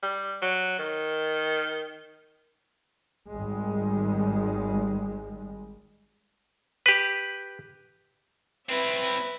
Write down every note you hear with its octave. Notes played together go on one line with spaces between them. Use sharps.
G3
F#3
D#3
G#1 G3 G#3
G4 B4
C4 E4 B4 E5